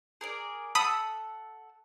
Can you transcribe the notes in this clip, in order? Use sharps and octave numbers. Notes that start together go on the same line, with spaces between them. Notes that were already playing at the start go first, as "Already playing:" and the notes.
G#4 A#4 D5
A4 F#5 B5 D#6 E6